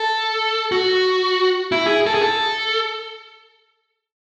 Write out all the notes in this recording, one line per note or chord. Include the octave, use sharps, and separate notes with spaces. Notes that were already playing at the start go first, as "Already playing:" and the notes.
Already playing: A4
F#4
E4
G#4
A4
G#4
A4